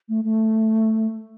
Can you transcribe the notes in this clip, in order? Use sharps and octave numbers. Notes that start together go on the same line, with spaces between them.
A3
A3